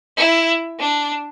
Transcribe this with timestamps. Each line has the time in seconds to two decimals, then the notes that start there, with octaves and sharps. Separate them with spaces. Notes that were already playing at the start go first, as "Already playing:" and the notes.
0.17 E4
0.79 D4